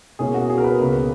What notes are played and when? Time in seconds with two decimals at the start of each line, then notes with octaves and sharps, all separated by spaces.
0.19 B2 A#3 C#4 E4 G#4
0.34 F#4
0.50 G#4
0.58 A#4
0.64 B4
0.80 C#2 B2 A#3 C#4